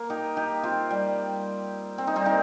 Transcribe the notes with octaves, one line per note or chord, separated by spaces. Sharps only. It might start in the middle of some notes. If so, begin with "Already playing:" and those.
Already playing: A#3
D#4 G4
D#4 G4
C4 F4
G3
C4
D#4
G3 C4
A#3 D#4